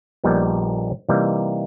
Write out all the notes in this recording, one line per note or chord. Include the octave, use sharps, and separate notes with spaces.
A#1 A#2 G3 B3 D#4
C3 E3 G3 A#3 D#4